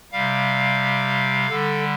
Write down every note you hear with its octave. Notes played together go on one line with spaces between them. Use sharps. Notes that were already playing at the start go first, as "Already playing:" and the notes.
C3 G3 F5
D3 G3 A4